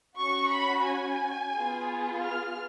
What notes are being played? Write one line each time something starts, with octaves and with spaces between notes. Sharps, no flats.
C#4 F#4 C#6
B5
G#5
B3 F4 G#4
F6